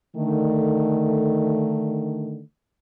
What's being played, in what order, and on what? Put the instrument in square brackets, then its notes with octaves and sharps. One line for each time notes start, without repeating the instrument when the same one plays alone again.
[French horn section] D3 D#3 A3